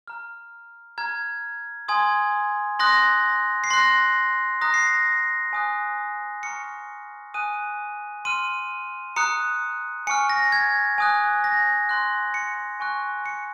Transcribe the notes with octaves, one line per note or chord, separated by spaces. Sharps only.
A#5 F6
A#5 F6 G#6
G#5 C6 D#6 G#6
C6 D#6 F#6 A#6
C7
C6 F#6 A#6
A#5 D#6 F#6 A#6
C7
A#6
G#5 D#6 F#6
A#5 C#6 F6 C#7
G#5 D#6 F#6 D#7
C6 F6 D#7
A#5 D#6 F#6 C#7
G#5 C#6 F6 C#7
A#6
G#6
G#5 D#6 F#6
A#6
C6 F#6
C#7
G#5 C#6 F#6
C#7